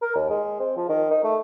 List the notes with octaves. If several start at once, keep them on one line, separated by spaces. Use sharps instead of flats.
A#4
D#2
G#3
C4
F3
D#3
D#4
A3